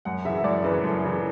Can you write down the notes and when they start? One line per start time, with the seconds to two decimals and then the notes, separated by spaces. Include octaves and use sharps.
0.05 F#2 F#5
0.25 C#3 E5
0.29 E3
0.38 E5
0.44 F#2 D5
0.64 C#3 E3 B4
0.84 F#2 A4
1.04 C#3 E3